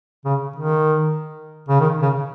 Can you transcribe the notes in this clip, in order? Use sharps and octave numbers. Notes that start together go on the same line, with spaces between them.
C#3
D#3
C#3
D#3
C#3